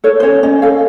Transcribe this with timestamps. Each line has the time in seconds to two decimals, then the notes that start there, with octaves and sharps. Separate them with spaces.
0.04 A4 C#5
0.20 C5
0.23 C#4 C#5
0.43 C#4 D#5
0.62 A4 F5